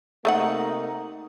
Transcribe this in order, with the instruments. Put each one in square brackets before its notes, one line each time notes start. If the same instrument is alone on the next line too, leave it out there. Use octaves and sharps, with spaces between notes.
[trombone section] C3 A#3 D#4 [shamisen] A3 D#5 F#5